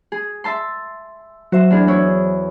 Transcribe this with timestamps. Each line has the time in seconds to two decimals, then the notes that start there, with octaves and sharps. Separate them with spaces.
0.12 G#4
0.44 E5 A5 C6
1.52 F#3 F#4 C5 E5
1.70 E2 D4 G#4
1.87 B3 E4 C#5